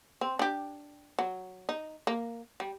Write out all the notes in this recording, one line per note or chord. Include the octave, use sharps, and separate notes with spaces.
C4
D4 G4
F#3
D#4
A#3
G3